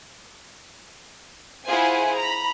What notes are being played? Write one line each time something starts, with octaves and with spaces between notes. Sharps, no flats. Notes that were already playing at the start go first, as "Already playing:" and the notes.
E4 F4 G#4 C5 F#5 G#5
A#5 B5